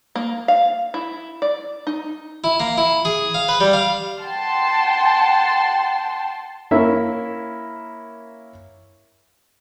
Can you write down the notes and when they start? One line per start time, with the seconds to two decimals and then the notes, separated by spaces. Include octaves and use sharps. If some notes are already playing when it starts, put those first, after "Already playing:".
0.15 A#3
0.48 F5
0.94 E4
1.42 D5
1.87 D#4
2.44 E4
2.60 A#3
2.78 E4
3.05 G#4
3.34 F5
3.48 B4
3.60 G3
3.73 F5
4.21 F#5 G5 A5 C6
6.71 A#3 C#4 E4 A#4 E5